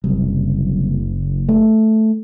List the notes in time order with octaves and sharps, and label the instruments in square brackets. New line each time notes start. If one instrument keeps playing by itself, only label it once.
[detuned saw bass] F#1 [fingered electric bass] C2
[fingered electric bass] A3